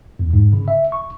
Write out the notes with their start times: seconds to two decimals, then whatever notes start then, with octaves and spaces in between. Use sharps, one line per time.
0.19 E2
0.33 G#2
0.53 C#3
0.68 E5
0.92 C#6